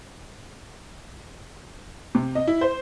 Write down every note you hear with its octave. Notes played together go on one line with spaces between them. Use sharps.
C3
D#5
E4
C5